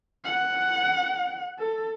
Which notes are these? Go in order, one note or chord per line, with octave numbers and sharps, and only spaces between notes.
F#5
A4